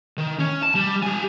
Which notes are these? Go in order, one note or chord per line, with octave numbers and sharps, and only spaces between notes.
D#3
C#4
A5
G3
G4 G#5